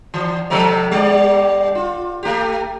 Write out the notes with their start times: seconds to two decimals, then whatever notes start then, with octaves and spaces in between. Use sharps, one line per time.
0.14 E3
0.50 C3 F3 A4
0.91 G3 D5
1.75 F4
2.23 A3 G4